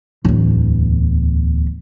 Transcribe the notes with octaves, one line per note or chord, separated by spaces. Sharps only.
D1 E2